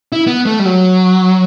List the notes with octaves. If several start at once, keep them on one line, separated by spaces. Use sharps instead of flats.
E4
B3
A3
G3
F#3